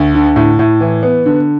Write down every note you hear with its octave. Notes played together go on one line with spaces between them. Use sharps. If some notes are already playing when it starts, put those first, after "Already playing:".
Already playing: D2
D3
A2
A2
E3
B3
D3